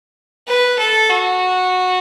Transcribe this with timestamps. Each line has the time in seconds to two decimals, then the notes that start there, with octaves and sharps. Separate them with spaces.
0.48 B4
0.79 A4
1.09 F#4